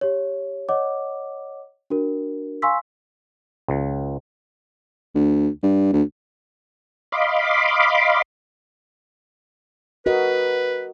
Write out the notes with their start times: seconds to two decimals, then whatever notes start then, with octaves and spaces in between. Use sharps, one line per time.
0.01 G4 C#5
0.69 C#5 D#5 F#5 D6
1.90 D4 F#4 A#4
2.62 F5 G#5 C6 C#6 E6 B6
3.68 C#2
5.15 D2
5.63 G2
5.93 D2
7.12 D#5 F5 B5 C6 D6
10.06 F#4 A#4 B4 D#5